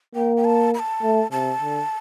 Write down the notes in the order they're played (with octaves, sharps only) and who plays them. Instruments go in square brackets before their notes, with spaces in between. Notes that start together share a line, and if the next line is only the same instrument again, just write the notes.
[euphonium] A#3 [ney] G5
[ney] G5
A5
B5
A5
[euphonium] A3
[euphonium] C3 [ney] A5
[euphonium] D3